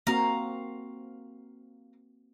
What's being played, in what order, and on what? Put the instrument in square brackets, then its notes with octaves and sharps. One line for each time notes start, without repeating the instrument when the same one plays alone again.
[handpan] A#3 C4 F#4 [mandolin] F5 A#5